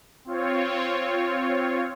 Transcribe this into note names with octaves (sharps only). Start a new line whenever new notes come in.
C4 F4 C#5